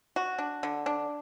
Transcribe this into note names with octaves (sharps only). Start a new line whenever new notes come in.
F#4
D4
D3
D4